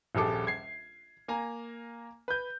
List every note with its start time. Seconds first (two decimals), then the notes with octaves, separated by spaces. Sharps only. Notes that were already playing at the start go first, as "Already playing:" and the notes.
0.15 D#1 A#1 G3 G#4 A4 D6
0.47 G#6 C7
1.28 A#3 G#5 A#5
2.28 B4 G6